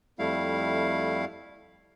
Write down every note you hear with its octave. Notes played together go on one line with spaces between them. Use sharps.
F2 G3 A3 E4 F5